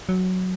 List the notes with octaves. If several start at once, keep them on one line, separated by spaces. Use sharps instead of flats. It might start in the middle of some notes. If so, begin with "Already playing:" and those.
F#3